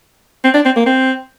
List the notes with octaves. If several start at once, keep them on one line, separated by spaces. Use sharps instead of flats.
C4
D4
C4
A#3
C4